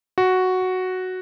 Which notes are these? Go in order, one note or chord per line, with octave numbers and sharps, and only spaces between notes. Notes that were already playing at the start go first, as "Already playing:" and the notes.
F#4